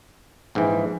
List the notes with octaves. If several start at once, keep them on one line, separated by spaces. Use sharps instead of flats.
A#1 G#2 E3